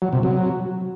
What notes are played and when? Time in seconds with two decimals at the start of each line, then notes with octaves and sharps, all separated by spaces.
0.02 F#3
0.13 C3
0.23 F#3